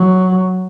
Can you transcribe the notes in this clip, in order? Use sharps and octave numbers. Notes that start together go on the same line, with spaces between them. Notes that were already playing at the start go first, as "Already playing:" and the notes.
Already playing: F#3